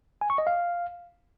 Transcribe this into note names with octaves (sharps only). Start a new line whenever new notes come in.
G#5
C#6
D#5
F5